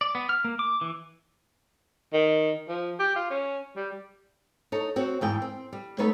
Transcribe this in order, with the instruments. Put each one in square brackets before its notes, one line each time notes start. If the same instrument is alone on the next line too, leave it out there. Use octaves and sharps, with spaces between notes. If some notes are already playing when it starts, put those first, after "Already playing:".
[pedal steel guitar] D5
B3
F6
A#3
D6
E3
[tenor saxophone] D#3
F3
G4
F4
C#4
G3
[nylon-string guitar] D#4 A4 C#5
C4 F#4 C#5
E2 G#2 G5
C4
G3
A3 B3 D#4 B4 C#5